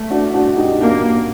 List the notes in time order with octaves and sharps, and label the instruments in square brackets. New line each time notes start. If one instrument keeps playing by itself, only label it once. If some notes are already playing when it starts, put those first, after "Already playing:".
Already playing: [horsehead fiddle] A3
[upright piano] D4 F#4
D4 F#4
D#4 G4
[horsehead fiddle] A#3 [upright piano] D4 F#4